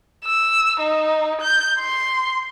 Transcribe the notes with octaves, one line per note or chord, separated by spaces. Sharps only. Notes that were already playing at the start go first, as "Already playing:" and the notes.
E6
D#4
G6
C6